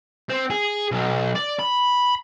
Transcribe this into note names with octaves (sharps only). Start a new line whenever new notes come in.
C4
G#4
B1
D5
B5